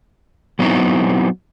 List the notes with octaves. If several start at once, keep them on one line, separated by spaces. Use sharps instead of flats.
F#3 B3 C4 D#4 E4